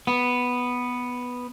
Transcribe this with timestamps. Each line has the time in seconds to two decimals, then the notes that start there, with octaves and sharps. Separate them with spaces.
0.07 B3